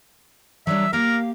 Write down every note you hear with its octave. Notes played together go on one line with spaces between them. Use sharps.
F#3 G3 D4 E5
A#3 G4 A#4 F5